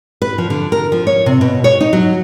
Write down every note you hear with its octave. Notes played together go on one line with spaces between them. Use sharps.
B4
F3
D3
A#4
F3
C#5
C3
B2
C#5
D#4
F#3